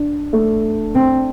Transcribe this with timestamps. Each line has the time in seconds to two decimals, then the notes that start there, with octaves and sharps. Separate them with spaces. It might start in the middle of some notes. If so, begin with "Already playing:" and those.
Already playing: D4
0.33 A3
0.95 C4